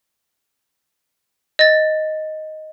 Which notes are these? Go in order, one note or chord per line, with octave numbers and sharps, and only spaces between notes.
D#5 A6